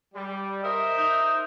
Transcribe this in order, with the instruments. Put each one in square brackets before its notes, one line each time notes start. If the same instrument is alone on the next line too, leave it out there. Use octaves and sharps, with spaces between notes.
[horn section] G3
[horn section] A#4 C5 E5 [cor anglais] D#5
[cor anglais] D#4